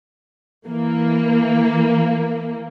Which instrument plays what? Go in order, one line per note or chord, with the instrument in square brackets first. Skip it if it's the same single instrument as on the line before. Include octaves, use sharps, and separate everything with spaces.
[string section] E3 A#3